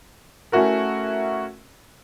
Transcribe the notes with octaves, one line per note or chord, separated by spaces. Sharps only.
A3 C#4 E4 F#4 A#4